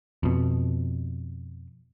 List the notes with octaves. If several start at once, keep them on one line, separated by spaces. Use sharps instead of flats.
F2 B2